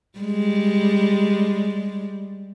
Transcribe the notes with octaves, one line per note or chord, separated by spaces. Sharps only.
G3 G#3